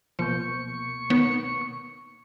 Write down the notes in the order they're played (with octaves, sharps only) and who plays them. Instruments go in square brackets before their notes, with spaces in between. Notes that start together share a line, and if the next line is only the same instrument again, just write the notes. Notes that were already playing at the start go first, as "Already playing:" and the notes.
[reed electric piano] B2 A#3 G6 [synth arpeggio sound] F3 [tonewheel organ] C#6
[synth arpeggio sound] D#3 B3 C#5